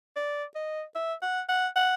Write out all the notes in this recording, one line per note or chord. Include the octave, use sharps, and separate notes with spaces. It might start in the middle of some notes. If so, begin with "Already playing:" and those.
D5
D#5
E5
F#5
F#5
F#5